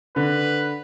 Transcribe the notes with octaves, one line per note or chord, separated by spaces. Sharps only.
D3 B4